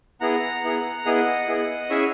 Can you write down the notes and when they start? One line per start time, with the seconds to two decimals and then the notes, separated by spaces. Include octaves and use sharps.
0.21 B3 E4 G#4 F#5 A#5
0.63 B3 E4 G#4
1.05 B3 E4 G#4 D#5 F#5
1.48 B3 E4 G#4
1.90 C#4 E4 G#4 C#5 E5